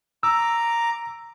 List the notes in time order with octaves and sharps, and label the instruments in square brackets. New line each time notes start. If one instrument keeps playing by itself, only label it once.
[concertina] A#5 D6 [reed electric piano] E6